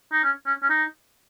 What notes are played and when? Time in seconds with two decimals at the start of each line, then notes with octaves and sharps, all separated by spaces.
0.13 D#4
0.24 C#4
0.46 C#4
0.63 C#4
0.70 D#4